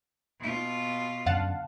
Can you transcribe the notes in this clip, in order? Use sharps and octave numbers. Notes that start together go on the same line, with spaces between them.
B2 F4
F#2 D3 F5 F#5 A5